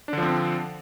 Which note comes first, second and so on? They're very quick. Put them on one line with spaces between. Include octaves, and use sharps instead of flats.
D4 D3 F3 C4